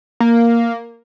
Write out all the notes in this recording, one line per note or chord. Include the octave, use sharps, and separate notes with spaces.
A#3